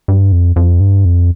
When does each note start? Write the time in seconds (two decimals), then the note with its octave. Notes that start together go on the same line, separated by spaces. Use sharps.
0.08 G2
0.32 F2
0.56 F2
0.80 G2
1.05 F2